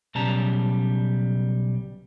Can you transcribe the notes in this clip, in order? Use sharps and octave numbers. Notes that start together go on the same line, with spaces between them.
B1 C#3 G3 A5 A#5